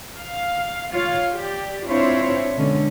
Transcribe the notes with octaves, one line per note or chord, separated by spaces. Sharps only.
F5
F4 C#5 F5
G4 D5
C4 D4 E4 F4 C5 C#5
B2 D3 G#3 C#4